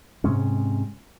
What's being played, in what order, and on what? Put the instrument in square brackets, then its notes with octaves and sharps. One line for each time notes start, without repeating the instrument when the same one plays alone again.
[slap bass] G#2 C3 G#3 C#4